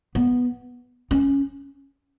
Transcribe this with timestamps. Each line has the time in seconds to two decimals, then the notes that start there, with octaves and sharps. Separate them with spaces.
0.15 B3
1.11 C#4